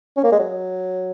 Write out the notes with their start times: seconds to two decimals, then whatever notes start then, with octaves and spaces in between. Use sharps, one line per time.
0.17 C#4
0.24 A#3
0.32 G#3
0.39 F#3